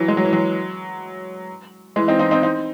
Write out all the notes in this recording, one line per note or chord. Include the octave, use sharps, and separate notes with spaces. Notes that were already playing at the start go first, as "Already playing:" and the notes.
Already playing: E3 F#3
G#3
F#3
E3
F#3
E3 G#3
C4 D#4
C4 D#4
C4 D#4
C4 D#4